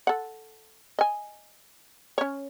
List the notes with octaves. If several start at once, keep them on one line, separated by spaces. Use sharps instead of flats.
A4 F#5
D#5 G#5
C#4 C#5